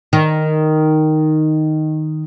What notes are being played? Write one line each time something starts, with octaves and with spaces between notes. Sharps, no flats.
D#3